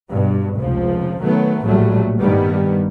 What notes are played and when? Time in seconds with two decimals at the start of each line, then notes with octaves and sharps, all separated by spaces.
0.12 G2 B2
0.59 F1 C#2 F3
1.22 D#3 F#3 A3 B3
1.65 A#1 A2 F#3 G3 A3
2.20 G2 D#3 G3 B3